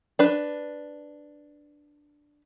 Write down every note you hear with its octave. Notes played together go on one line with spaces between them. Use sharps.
D4 B4